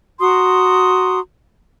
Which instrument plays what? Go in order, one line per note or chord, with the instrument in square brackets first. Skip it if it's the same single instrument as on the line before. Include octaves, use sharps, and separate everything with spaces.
[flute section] F#4 A#5 C6 D#6